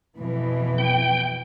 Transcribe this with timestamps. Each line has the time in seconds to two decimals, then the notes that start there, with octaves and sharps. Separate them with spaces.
0.16 F2 B2 E3
0.78 G5